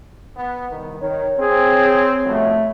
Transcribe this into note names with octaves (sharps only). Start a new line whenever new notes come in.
B3
C2 D#3
D#3 C#5
C4 G#4
C2 F2 B2 A3